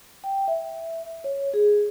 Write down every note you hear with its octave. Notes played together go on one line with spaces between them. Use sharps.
G5
E5
C#5
G#4